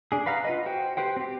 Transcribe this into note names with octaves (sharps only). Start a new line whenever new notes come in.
D4 G#4
B4 F5 F#5 A#5 F6
F4 B4 D#5
F#4 C5 G5
G4 B4 C5 G5
C4 G4